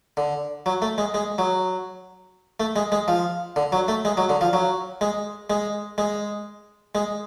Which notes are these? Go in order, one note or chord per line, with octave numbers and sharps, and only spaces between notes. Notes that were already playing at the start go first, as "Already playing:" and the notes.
D3
F#3
A3
G#3
G#3
F#3
A3
G#3
G#3
F3
D3
F#3
A3
G#3
F#3
D3
F3
F#3
G#3
G#3
G#3
G#3